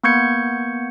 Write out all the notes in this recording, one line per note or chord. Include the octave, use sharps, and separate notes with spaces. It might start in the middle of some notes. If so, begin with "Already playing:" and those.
A#3 B3 C#6 G6 G#6 C#7